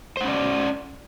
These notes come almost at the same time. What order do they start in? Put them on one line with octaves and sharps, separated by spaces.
C5 F#5 C#4 D5